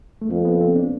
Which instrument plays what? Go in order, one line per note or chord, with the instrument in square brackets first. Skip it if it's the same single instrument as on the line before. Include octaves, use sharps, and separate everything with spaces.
[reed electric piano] A3
[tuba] F2 [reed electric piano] A#3
[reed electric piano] B3
C4
D4